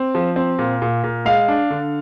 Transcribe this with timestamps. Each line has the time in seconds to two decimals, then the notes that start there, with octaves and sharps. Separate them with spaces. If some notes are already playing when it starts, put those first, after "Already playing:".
Already playing: C4
0.15 F3
0.36 C4
0.59 A#2
0.82 A#2
1.04 A#2
1.25 G#3 F5
1.48 D4
1.70 D3